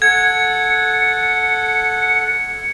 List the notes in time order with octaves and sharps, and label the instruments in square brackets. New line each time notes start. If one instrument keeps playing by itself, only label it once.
[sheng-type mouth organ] A4 F#5 [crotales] G#6 [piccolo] C#7